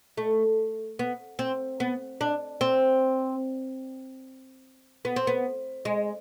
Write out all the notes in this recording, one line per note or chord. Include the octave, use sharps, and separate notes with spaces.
A3
B3
C4
B3
D4
C4
B3
C4
B3
G#3